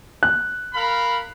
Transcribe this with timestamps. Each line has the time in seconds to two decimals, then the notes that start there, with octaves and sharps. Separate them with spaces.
0.23 F#6
0.74 A#4 F5 B5